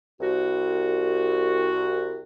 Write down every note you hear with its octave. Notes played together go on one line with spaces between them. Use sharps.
C2 F#4